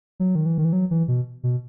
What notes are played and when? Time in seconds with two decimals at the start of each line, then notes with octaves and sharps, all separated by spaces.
0.20 F#3
0.35 D#3
0.46 E3
0.58 D#3
0.65 E3
0.73 F#3
0.91 E3
1.08 B2
1.43 B2